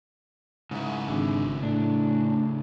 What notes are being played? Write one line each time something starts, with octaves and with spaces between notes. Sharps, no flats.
G#2 C#3 E4
G#1 D3
A2 D4